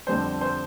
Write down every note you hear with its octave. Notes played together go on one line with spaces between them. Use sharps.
F2 D3 G3 C5
C5